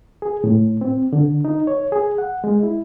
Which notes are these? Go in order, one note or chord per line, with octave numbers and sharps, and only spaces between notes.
G#4
A2
C4
D3
D#4
C#5
G#4
F#5
G#3
E4